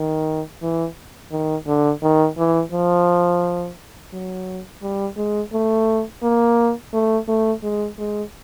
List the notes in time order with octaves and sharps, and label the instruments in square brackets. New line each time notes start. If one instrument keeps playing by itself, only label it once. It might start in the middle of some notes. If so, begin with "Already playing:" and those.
Already playing: [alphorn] D#3
E3
D#3
D3
D#3
E3
F3
F#3
G3
G#3
A3
A#3
A3
A3
G#3
G#3